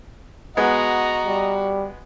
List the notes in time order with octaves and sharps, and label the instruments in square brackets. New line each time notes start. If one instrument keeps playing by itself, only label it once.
[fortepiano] G#3 B3 [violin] F#4 [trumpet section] D#5 A#5
[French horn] G3